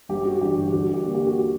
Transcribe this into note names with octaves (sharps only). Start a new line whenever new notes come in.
G1 G4
F#4
G2 E3 G4
D2 F#4
G4
D3 G3 A#3
G4
F#4